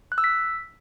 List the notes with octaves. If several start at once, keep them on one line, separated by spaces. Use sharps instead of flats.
F#6
E6
B6